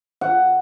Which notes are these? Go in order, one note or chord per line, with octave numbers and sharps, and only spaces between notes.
F#5